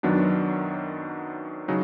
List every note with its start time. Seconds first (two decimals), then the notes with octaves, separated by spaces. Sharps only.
0.03 F#2 D#3 F#3 B3 D4
1.68 C#3 F#3 D#4